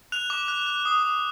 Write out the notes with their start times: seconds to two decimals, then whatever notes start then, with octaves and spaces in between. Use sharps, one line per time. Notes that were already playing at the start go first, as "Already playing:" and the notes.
0.12 F#6 F7
0.30 D6
0.48 F#6
0.66 F#6
0.85 D#6
1.03 D#6